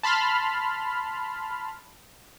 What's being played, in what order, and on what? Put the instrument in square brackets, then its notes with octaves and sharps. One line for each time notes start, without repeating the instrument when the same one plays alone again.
[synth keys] A5 B5 C6 F6